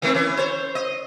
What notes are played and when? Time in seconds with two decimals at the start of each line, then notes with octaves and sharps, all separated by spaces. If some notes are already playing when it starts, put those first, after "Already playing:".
0.02 D#3 A3 C4
0.14 E3 C#4
0.37 C5 C#5
0.75 D#5